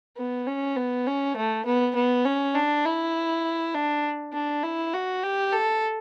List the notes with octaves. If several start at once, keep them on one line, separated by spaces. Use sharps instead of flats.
B3
C#4
B3
C#4
A3
B3
B3
C#4
D4
E4
D4
D4
E4
F#4
G4
A4